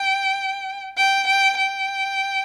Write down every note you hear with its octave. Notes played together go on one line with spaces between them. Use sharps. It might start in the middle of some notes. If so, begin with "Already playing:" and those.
Already playing: G5
G5
G5
G5